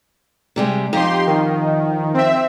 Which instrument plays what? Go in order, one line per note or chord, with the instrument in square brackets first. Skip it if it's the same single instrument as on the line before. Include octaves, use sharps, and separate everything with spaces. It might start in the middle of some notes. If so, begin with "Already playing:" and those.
[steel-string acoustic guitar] C3 G3 G#3
[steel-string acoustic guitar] F2 D#4 D#5 [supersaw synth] G4 C6
[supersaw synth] D#3
C4 E5